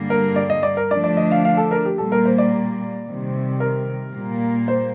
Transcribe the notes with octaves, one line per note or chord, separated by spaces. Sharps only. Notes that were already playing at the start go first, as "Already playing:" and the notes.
Already playing: G2 D3 G3 A#3
A#4
D5
D#5
D5
A#4
D3 F3 A3 D4 D5
D5
D#5
F5
F5
A4
A#4
G4
A#2 G3 A#3 A4
A#4
C5
D5
C3 D#3 G3
A#4
A#2 G3 A#3
C5